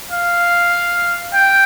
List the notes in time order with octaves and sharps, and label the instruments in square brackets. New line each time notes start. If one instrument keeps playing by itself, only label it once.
[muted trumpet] F5
G5